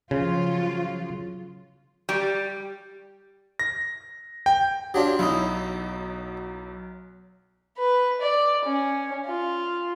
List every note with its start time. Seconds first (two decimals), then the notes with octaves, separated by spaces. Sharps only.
0.11 C#3 F3 F#3 F4
2.09 G3
3.59 A#6
4.46 G5
4.94 F#3 D4 F4 G4
5.19 B1 F#3 D#4 E4
7.77 B4
8.21 D5
8.65 C#4
9.26 F4